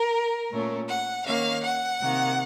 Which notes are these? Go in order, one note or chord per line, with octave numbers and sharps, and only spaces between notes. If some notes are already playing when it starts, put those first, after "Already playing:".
Already playing: A#4
A#2 A3 C#4
F#5
D#3 A#3 C#4 F5
F#5
C3 D#3 A#3